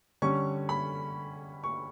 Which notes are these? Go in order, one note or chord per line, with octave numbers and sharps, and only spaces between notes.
D3 G3 C#4 C#6
B5
C#6